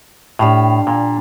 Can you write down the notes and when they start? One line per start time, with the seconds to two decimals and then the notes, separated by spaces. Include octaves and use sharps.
0.39 A2 D4 G4 F5
0.87 A#2